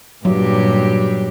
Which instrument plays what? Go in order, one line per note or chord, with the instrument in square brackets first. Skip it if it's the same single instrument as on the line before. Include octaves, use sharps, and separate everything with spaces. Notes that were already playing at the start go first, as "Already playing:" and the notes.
[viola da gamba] G2 A#2 G4 [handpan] F#3